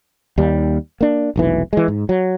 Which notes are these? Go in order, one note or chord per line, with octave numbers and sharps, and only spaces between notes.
D#2 G3
A#3 D4
F1 B1 E3
E3 G#3
G#2
F#3